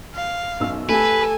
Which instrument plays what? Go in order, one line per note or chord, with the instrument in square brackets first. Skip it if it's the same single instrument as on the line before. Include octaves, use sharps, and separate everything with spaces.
[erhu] F5
[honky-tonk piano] B1 F#2 E6
[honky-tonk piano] A3 G4 [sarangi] A4 [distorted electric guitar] B4 [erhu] G#5